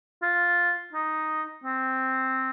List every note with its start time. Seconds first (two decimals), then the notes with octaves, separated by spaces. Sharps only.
0.23 F4
0.93 D#4
1.64 C4